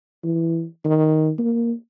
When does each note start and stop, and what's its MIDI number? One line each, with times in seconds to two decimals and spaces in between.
0.24 0.65 52
0.85 1.32 51
1.38 1.73 58